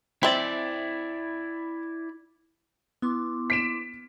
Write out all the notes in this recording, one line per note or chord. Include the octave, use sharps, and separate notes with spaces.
C4 E4 D5 E5
B3 E4 C6 D6
B6 D7 E7